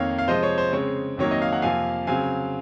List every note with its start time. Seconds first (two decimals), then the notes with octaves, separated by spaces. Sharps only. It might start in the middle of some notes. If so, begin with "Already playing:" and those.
Already playing: F2 D#3 A#3 C#5 F5
0.19 F5
0.28 C3 F3 G#3 C5 D#5
0.43 C#5
0.58 C5
0.73 C#3 G#3 C4 C#5
1.17 F2 D#3 F#3 A#3 C#5
1.31 D#5
1.42 F5
1.53 F#5
1.62 F2 C3 F3 A#3 F5 G#5
2.07 C#3 F#3 C4 F5 G#5